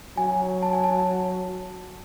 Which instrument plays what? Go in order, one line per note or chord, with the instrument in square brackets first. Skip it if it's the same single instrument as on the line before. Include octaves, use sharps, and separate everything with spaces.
[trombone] F#3 [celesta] G#5
[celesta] A5
G#5
A5